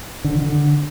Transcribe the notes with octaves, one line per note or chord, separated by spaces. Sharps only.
D3
D#3
D3